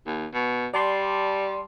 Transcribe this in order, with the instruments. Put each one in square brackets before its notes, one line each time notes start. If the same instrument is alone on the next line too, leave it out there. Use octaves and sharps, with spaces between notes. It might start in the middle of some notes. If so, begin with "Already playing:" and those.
[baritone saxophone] D#2
B2
[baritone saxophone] G3 [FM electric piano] D5 A5 C6